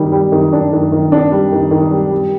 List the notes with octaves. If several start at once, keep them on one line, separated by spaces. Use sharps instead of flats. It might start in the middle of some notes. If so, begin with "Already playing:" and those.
Already playing: D#3 G3
G3
D#3
D4
D#3
D#3
D4
G3
D#3
D#3
G3
G3